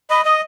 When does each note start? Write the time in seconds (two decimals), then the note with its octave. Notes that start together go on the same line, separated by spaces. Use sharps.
0.10 D#5 B5
0.25 D#5 D#6